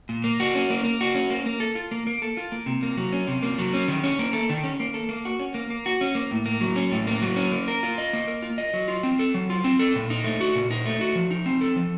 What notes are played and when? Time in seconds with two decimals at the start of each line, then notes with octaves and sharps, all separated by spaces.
0.09 A#2
0.24 A#3
0.40 F#4
0.55 C#4
0.70 A#3
0.84 A#3
1.01 F#4
1.15 C#4
1.30 A#3
1.46 A#3
1.60 A4
1.75 F4
1.91 A#3
2.07 A#3
2.22 A4
2.37 F4
2.52 A#3
2.66 C3
2.83 A#3
2.97 F#3
3.12 C#4
3.27 C3
3.43 A#3
3.58 F#3
3.74 C#4
3.88 D#3
4.03 C#4
4.19 A#3
4.33 A4
4.49 D#3
4.63 C#4
4.80 A#3
4.94 A4
5.09 A#3
5.25 F#4
5.40 C#4
5.54 A#3
5.70 A#3
5.86 F#4
6.01 C#4
6.15 A#3
6.31 A2
6.46 A#3
6.61 F#3
6.76 C#4
6.91 A2
7.07 A#3
7.22 F#3
7.36 C#4
7.52 A#3
7.68 A#4
7.83 F4
7.98 D#5
8.13 A#3
8.27 A#4
8.42 F4
8.58 D#5
8.73 F#3
8.88 F4
9.03 C4
9.19 A4
9.34 F#3
9.50 F4
9.64 C4
9.79 A4
9.95 A#2
10.10 D#4
10.24 A3
10.41 F#4
10.55 A#2
10.71 D#4
10.85 A3
11.01 F#4
11.15 F3
11.30 D#4
11.46 C4
11.61 A4
11.76 F3